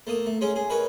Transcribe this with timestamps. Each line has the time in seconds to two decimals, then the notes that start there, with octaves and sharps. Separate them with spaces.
0.07 A3 A#3 D#6
0.26 A3
0.41 G#3 C#4 G#4
0.56 G#4
0.70 A#4 B4 C#5 D#5 G#5